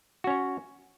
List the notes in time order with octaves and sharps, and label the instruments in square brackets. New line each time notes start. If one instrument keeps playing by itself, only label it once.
[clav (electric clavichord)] F#4
C#4
C#5